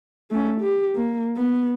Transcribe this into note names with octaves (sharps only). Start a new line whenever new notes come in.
A3 C#4
G4
A#3
B3